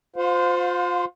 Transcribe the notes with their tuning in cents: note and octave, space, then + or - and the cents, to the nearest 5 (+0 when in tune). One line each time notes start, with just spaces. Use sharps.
F4 +25 C5 -15 F5 +40